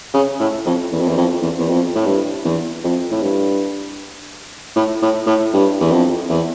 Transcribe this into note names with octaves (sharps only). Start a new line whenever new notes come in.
C#3
A2
F2
E2
F2
E2
F2
E2
E2
F2
A2
G2
E2
F2
A2
G2
A2
A2
A2
G2
E2
F2
E2